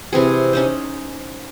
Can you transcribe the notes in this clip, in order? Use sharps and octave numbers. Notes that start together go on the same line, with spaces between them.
C3 E3 C4 G#4
C#4 D#4 C5